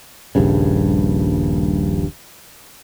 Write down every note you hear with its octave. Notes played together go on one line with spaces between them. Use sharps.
D#1 A#1 G2 C#3